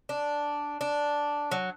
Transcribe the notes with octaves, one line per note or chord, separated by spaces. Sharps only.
D4
D4
F#3